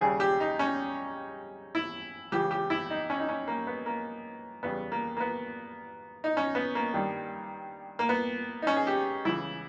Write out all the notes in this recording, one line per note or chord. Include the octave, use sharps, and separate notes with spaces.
D#2 C#3 G3 G#4
G4
D#4
C#4
E4
C#2 C#3 E3 G4
G4
E4
D#4
C#4
D#4
C#4
A#3
B3
A#3
E2 C#3 G3 B3
A#3
A#3
B3
D#4
C#4
B3
A#3
G2 D#3 G3
A#3
B3
D#4
C#4
G#4
G4
C#2 C#3 E3 E4